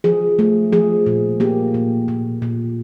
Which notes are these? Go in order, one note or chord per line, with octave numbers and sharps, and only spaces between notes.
F3 G#4
A3
F3 G#4
A#2
A#3 G4
A#2
A#2
A#2